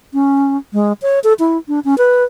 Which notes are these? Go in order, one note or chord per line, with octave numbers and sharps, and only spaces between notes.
C#4
G#3
C#5
A4
E4
D4
C#4
B4